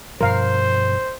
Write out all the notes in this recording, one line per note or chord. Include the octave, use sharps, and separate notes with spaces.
G2 B2 F3 A#4 C5 F5